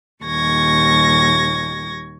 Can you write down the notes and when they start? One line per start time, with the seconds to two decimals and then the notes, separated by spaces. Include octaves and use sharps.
0.24 D#2 A#2 G3 C#6 G#6 A#6